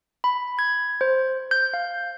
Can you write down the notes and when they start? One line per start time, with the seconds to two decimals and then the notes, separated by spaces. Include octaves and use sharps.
0.24 B5
0.59 G#6
1.01 C5
1.51 G6
1.74 F5